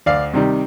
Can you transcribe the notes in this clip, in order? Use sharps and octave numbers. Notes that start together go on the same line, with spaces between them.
D2 D5 F5
C3 D#3 G3